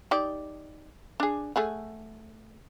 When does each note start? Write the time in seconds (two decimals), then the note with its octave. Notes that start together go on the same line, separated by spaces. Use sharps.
0.11 D#4 G4 D5
1.20 D4 G#4
1.56 A3 G#4 F#5